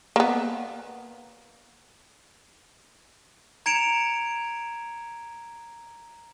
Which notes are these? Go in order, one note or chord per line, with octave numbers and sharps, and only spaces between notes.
A#3 B3
A#5 G#6 C#7 D7 E7 F7